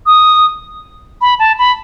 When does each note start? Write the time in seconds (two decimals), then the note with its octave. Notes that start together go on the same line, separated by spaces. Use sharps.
0.06 D#6
1.21 B5
1.39 A5
1.59 B5